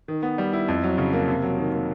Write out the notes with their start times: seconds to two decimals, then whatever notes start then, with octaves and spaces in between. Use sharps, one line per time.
0.08 D#3
0.23 B3
0.38 G3
0.53 E4
0.68 F2
0.84 F#3
0.98 C#3
1.13 A#3
1.28 C3
1.43 F#3
1.57 D#3
1.72 A#3